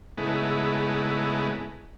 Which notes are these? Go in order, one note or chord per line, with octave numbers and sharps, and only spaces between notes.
G#2 C#3 G#3 A3 B3 E4